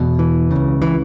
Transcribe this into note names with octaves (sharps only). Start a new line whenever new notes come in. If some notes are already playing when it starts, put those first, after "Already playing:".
Already playing: E2 B2
E3
C#2 C#3
E3